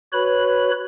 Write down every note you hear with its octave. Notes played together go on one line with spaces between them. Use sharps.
F#4 B4 C#5 B5